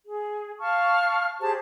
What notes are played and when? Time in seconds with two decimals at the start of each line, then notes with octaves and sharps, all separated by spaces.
0.06 G#4
0.60 F5 A5 C#6 F6
1.40 G4 G#4 C5 A5